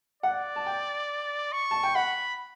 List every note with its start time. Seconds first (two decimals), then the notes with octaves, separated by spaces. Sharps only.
0.23 D5 F#5
0.56 A5
0.66 G5
1.53 C#6
1.71 A5
1.83 G5
1.95 F#5 B5